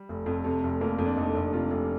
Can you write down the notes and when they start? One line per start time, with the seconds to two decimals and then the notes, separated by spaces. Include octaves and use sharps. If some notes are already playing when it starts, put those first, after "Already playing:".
Already playing: G3
0.09 F1
0.26 F2
0.44 C3 A3
0.63 F1
0.81 F2 A#3
0.99 F2
1.06 D4
1.16 F1 D#4
1.35 F1
1.53 C3 F4
1.71 F1